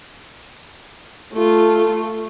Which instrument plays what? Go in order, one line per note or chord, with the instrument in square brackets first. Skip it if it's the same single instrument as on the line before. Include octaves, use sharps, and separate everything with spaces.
[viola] A3 F4